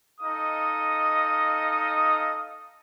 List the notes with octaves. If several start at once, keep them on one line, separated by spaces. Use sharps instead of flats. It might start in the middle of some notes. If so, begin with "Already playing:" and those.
D#4 A4 D#5 F5 D#6